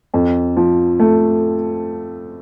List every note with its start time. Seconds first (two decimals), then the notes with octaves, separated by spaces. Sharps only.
0.14 F2
0.56 F3
0.99 A3